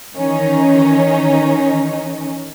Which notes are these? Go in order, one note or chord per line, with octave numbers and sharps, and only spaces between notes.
D#3 E3 C#4 D#4